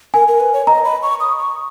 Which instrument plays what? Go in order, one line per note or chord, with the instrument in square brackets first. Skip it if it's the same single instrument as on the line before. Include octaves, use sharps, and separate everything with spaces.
[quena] A#4 [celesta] G#5
[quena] A#4
B4
C#5
[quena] D#5 [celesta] A#5
[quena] B5
C#6
D#6
C#6